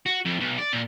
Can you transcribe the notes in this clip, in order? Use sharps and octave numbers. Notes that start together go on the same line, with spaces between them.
F#4
F2
B1
D5
A#2